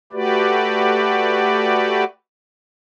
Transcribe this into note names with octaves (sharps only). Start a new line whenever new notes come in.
A3 F#4 G4 B4 D5